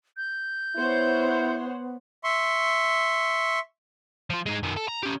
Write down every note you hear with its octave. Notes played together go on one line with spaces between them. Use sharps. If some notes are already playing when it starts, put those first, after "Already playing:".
G6
B3 E4 C5 C#5 F#5
E5 C6 C#6
F3 F4
G#3 D#4
F#2 D#3
A4
A#5
C#4 G4